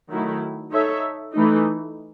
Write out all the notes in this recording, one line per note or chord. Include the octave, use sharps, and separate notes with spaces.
D#3 F#3 A3 E4
D#4 A4 C#5 E5
E3 A3 D#4